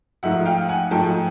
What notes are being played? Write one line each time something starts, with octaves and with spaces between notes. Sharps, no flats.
G#2 F3 A3 E5 F#5
F5 G5
F#5 G#5
G#2 F3 A3 G5 A5